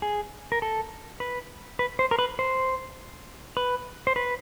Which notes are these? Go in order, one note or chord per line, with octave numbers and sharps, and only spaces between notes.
G#4
A#4
A4
B4
B4
C5
A#4
B4
C5
B4
C5
B4